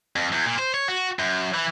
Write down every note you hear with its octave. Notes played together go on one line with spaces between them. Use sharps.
F2
E2
A#2
C5
C#5
F#4
F#2
E3